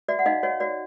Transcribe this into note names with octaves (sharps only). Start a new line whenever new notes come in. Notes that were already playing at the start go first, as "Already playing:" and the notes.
F#4 D5 E5
F#5
D#4 D#5 F5
F#4 C#5 D#5
F#4 D5